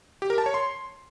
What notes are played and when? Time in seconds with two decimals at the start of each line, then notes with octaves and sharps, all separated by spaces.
0.22 G4
0.30 A#4
0.38 A5
0.46 C#5
0.54 C6